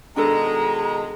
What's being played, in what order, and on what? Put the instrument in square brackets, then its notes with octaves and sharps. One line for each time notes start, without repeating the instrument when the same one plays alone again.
[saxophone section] B2 D#3 G#3 [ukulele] D4 A4 [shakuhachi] A#5